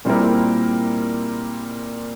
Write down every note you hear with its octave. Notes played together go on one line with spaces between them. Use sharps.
A#2 G3 C4 E4 A#4